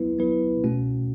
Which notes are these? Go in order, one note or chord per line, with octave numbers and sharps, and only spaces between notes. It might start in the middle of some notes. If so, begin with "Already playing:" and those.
Already playing: F#3 B3 E4 B4
F#3 B3 E4 B4
B2 A3 C#4 F#4